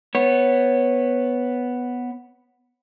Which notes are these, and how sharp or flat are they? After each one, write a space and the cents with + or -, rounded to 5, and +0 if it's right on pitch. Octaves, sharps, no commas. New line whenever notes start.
B3 +0 C#5 -15